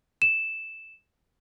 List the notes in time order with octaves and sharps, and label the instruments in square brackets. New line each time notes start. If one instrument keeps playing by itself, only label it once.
[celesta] E7